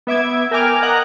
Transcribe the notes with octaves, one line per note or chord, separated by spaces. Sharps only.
B3 E5 D6 G#6
A#4 G5 G#5 D6 F6
D#5 F#5 A#5 F#6